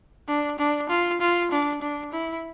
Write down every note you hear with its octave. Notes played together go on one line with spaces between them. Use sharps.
D4
D4
F4
F4
D4
D4
E4